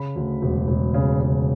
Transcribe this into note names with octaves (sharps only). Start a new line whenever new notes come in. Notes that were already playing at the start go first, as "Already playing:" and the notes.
Already playing: C#3 B5
D2
E1
E1
C#3
C#3